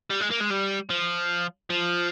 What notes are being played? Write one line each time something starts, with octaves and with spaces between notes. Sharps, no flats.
G3
G#3
A#3
G#3
G3
F3
F3